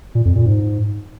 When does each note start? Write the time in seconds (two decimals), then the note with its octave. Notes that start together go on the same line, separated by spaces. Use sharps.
0.15 A#2
0.25 F2
0.35 A#2
0.46 G#2